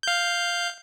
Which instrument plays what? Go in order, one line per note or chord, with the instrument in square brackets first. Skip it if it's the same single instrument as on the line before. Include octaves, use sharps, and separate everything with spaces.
[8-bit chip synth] F5 G6